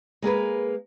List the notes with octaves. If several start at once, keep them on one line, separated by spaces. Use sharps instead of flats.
G#3 A#3 G#4 B4